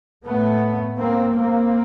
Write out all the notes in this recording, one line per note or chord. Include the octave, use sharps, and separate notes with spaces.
A2 A3 B3
A#3 C4
A#3 C4